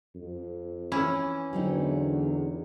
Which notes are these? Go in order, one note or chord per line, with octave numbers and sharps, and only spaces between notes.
F2
E3 C#4 E4
E2 D3 F#3 C4 D#4